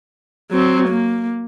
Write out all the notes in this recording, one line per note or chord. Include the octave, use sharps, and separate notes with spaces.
F#3 C4
A#3